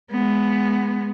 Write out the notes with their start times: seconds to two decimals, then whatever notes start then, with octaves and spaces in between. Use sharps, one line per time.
0.11 G#3 B3